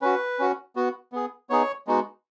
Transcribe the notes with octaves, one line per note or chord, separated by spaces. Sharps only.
C#4 F#4 B4
C#4 F#4
B3 F#4
B3 G#4
B3 D#4 G#4 C#5
G#3 B3 D#4 F#4